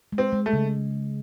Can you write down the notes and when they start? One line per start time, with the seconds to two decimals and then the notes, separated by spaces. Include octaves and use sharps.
0.12 G#3
0.18 C4
0.32 G#3
0.46 A3
0.53 C#3